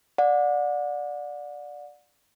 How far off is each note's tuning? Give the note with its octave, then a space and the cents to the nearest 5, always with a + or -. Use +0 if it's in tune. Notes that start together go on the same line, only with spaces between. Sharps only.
D5 +0 F#5 -35